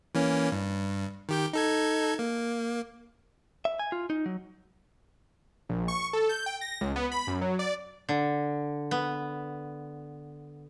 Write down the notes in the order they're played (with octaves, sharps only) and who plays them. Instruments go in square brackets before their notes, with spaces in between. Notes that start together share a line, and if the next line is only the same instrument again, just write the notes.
[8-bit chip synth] E3 A#3 C#4
G2
D#3 G4 G6
D#4 A4 G#6
A#3
[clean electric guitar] E5
G#5
F4
D#4
F#3
[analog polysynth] A#1
C#6
A4
G6
G5
A#6
C#2
B3
B5
F#2
F#3
D5
[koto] D3
B3